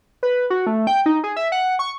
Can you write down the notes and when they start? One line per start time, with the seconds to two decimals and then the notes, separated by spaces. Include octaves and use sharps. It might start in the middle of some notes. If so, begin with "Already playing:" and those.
0.23 B4
0.50 F#4
0.67 A3
0.87 G5
1.06 D#4
1.24 G#4
1.36 E5
1.52 F#5
1.79 C#6